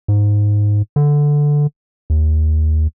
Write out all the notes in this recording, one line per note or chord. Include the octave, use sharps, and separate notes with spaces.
G#2
D3
D#2